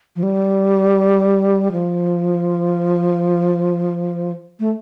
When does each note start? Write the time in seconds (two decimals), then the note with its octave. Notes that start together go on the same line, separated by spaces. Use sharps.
0.16 F3
0.23 G3
1.72 F3
4.60 A3